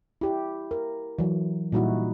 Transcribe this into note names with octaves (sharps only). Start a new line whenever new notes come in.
E4 G4
A#4
E3 F#3
A#2 G3 D#4 E4 F#4